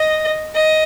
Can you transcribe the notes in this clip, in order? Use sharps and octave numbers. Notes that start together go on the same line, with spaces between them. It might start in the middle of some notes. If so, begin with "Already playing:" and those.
Already playing: D#5
D#5